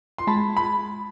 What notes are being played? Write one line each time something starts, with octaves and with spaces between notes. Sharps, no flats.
C6
G#3 A5 B5
B5